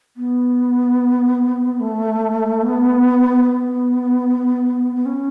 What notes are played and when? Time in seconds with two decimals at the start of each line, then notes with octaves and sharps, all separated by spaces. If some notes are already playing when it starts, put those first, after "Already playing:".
0.17 B3
1.80 A3
2.62 B3
3.44 B3
4.95 B3
5.06 C#4